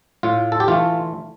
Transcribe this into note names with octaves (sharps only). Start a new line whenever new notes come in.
A2 F4
A4
G4
E3 A3 F4